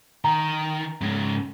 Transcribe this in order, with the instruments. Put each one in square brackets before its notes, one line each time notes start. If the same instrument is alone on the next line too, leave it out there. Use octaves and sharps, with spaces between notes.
[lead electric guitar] D#3 [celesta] A#5
[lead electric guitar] G#2 C#3